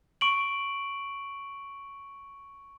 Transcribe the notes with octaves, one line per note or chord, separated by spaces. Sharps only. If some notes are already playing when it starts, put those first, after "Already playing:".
C#6 D7 F#7